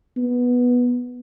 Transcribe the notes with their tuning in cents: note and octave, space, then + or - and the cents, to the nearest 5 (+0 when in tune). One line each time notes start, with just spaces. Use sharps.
B3 -10